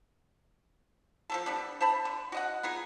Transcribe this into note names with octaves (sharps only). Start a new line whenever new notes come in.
F3 F#3 A4
G3 B3 D4
C5 E5 A5 B5
D3
F#4 D#5 F#5
B3 D#4 F4 G#4